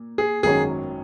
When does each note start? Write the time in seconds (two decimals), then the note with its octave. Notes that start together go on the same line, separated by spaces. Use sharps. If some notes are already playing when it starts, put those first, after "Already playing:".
Already playing: A#2
0.18 G#4
0.43 G#1 F#2 D#3 F#3 C#4 G#4